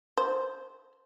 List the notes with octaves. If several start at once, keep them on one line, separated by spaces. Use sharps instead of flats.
C5